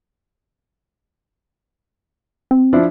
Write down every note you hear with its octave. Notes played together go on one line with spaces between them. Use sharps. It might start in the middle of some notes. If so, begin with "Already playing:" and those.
C4
F3 D4 E4